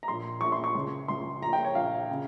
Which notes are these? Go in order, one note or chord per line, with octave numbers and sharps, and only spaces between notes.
A#5
A#1 A#2 C6
A#1 A#2 C#6
C6
C#6
C#2 C#3
C#2 C#3 C6
A#1 A#2 A#5
G5
C#5
A#1 A#2 F5
C#3